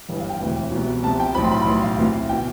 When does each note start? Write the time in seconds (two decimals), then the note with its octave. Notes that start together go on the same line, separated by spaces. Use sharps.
0.09 G1 G2 E3
0.19 F5
0.29 G5
0.40 E1 D2 C3 E3
0.72 C2 B2
1.03 C2 C3 F3 A5
1.20 G5
1.35 B1 A2 F3 B5
1.44 C6
1.51 B5
1.62 B5
1.66 B1 A2 E3 C6
1.82 F5
1.98 D2 C3 E3
2.29 B2 G5